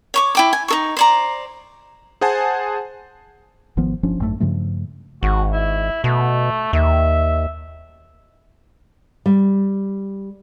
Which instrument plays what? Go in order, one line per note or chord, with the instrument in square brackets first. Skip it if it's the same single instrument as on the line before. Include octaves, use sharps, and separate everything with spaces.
[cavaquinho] C#5 C#6 D6
E4 G5 D6
G#5
D#4 A4 C#6
C5 D5 A#5
[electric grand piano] G#4 C5 F#5 G#5 A5
[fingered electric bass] G#1 D#3 F3 B3
G1 F3 C#4 D4
G#1 F#2 C#3 A3
G2 C#3 F3 A3
[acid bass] G#1 [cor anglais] F#4
[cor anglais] E4
[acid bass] B2 [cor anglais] A3
[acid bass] D#2 [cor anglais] E5
[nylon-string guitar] G3